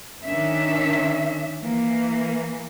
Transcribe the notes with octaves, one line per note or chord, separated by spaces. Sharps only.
D#3 C#4 D4 E5
E3 A#3